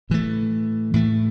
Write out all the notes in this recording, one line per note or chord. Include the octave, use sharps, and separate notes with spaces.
A2 E3 A3
A2 E3 A3